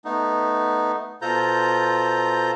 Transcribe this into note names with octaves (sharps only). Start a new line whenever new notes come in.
A3 B3 D#4
B2 F4 A4 C5 A#5 G6